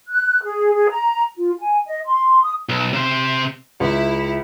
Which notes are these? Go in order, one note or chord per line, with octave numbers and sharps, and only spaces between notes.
F#6
G#4
G#4
A#5
F4
G#5
D#5
C6
D#6
B1
C3 C5
C#2 E4